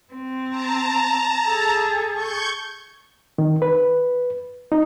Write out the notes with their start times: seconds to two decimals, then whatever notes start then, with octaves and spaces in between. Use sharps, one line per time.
0.14 C4
0.49 A5 A#5
1.46 G#4 A4
2.13 C#6 G6 G#6
3.38 D#3
3.62 B4
4.72 D#4